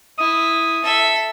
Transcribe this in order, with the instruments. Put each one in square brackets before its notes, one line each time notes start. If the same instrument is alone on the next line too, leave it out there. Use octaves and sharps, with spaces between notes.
[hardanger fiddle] E4 [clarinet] D#6
[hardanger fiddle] A4 E5